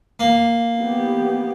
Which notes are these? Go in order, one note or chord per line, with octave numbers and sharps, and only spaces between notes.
A#3
B3 G4